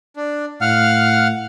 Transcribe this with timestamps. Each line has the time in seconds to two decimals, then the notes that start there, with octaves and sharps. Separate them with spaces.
0.16 D4
0.61 A2 F5 F#5 F6